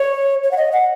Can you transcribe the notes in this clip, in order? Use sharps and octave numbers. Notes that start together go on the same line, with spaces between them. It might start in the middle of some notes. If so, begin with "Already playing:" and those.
Already playing: C#5
C#5
F#5
D#5
F#5